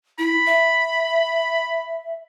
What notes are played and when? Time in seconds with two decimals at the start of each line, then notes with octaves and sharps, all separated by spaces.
0.18 E4 B5
0.46 E5